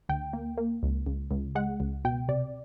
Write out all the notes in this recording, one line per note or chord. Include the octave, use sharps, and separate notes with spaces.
D2 G5
A#3
A#3
C#2
C#2
C#2
G#3 F#5
C#2
B2 G5
C3 D5